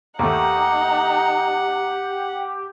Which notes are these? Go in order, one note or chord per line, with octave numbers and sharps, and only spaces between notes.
D#2 A3 D#4 G4 F#5